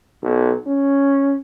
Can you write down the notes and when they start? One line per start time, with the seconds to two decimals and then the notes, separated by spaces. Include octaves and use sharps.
0.22 B1
0.67 C#4